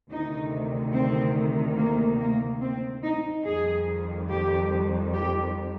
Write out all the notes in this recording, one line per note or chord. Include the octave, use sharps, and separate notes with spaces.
D2 C3 D#3 D#4
C4
A#3
A#3
C4
D#4
F2 D#3 G3 G#4
G4
G4